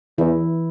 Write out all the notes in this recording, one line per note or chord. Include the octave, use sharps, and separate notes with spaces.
E2 E3 E4